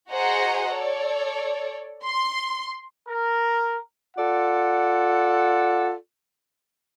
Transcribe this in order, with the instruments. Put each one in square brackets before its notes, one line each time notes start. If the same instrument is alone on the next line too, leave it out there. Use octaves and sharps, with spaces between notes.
[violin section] F#4 G#4 C5 D#5 F#5 A#5
A4 C#5 D5
C6
[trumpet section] A#4
[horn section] F4 A4 D5 F#5